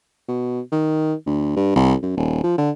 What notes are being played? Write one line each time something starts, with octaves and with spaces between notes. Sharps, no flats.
B2
D#3
D2
G2
C2
F#2
D#1
F3
D3